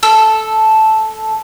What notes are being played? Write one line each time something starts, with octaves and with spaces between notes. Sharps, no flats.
A4 E6